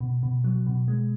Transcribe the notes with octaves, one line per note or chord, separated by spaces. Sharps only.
B2
B2
F#3
B2
G#3